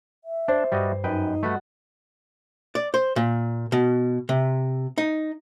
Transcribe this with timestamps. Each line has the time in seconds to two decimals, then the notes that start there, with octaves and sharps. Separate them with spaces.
0.24 E5
0.48 D4 C5
0.72 G2 G3 F#4 D#5
1.04 F#2 D#4 B4 D#5 G5
1.43 G3 A3 F#4 A4 B4
2.75 D5
2.94 C5
3.16 A#2
3.72 B2
4.29 C3
4.98 D#4